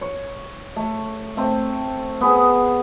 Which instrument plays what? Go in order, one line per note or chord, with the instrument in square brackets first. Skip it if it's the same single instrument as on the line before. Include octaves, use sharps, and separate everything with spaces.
[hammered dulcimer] C#5
A3
A3 C4
B3 G#4